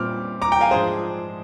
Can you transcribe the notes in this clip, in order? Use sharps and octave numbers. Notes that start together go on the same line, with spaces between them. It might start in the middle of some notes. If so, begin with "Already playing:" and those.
Already playing: A#2 G3 C4 D6 F6
A#5 D6
G5 A#5
F5 G#5
G#2 F3 G#3 D4 G#4 C5